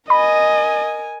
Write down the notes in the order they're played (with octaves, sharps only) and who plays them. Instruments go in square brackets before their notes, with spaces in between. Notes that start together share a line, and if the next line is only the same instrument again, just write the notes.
[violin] A#4 G#5 [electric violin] D#5 [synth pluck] B5